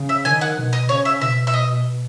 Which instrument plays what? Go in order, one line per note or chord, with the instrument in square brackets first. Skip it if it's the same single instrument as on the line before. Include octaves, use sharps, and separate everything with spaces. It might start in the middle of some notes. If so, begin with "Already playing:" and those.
Already playing: [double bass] C#3
[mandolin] E5
[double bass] D#3 [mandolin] G#5
[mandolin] F#5
[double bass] B2
[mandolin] D#5
[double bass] C#3 [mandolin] C#5
[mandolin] E5
[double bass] B2 [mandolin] E5
[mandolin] E5
D#5